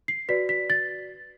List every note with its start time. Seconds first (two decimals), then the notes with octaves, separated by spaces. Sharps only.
0.08 C7
0.29 F#4 B4 D5 B6
0.49 B6
0.70 A6